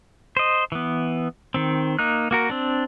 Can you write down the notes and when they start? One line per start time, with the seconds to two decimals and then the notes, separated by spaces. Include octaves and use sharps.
0.37 C5 D#5
0.72 E3 B3
1.54 D#3 C4
1.99 A#3 D#4 F#6
2.31 A#3 F#4 A#4
2.50 C4 D4